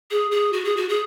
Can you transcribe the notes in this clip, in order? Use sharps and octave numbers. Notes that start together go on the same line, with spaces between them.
G#4
G#4
F#4
G#4
F#4
G#4